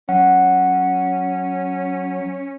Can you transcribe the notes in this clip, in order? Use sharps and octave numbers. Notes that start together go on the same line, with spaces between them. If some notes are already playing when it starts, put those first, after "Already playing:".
F#3 C#4 F#5